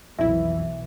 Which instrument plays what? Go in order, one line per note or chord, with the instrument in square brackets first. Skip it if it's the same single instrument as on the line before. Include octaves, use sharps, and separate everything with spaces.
[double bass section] B1 B2 E3 [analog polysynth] F2 E4 [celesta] E5